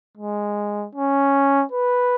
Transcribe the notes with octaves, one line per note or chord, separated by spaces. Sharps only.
G#3
C#4
B4